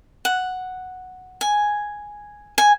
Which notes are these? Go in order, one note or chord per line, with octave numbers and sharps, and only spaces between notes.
F#5
G#5
G#5